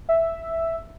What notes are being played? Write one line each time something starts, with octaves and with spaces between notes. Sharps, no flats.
E5